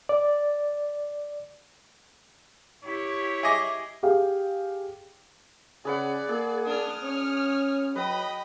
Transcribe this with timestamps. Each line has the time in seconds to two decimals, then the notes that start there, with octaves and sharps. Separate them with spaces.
0.09 D5
2.84 E4 G4 C#5
3.43 G#4 D#5 E5 D6
4.03 G4 G#4 F5 G5
5.85 C#3 G#4 B4 D5 F#5
6.29 A#3 G#4
6.66 D4 D#6 F6
7.03 C#4 C#5
7.96 F#3 B4 D#5 G5 B5 D#6